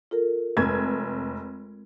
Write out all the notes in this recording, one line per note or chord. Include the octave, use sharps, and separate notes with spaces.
F4 A4 A#4
F1 G#3 G#6